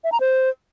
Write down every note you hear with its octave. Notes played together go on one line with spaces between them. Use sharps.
E5
A#5
C5